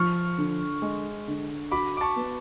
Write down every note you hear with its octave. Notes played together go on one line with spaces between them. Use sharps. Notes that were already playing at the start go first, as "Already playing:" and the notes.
Already playing: F3 C#6 F6
D3
G#3
D3
F#4 B5 D6
D6
A5 C#6
B3